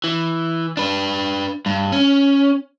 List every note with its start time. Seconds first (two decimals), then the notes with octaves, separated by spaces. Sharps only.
0.04 E3
0.77 D4 B4
1.66 G2
1.92 C#4